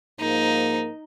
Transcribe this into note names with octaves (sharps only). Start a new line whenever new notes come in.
G#2 F3 A#3 D#4